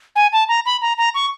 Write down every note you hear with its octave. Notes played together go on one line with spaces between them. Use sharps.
G#5
A5
A#5
B5
A#5
A#5
C#6